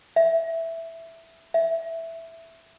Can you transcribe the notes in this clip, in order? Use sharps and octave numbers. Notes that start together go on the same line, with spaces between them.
E5
E5